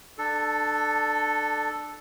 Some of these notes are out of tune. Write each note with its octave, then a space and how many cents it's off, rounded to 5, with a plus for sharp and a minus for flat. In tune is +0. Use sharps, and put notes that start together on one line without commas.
D4 +25 A4 +0